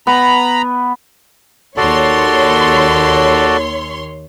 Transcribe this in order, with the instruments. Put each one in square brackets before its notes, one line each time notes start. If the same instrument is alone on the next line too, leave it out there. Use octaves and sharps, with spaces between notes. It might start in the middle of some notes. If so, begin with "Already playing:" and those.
[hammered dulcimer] B3 [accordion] A#5 B5
[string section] D#2 C#5 C6 [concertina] F#4 A4 D5